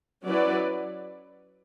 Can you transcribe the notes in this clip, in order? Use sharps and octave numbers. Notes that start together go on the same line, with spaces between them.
F#3 C#4 E4 B4 D5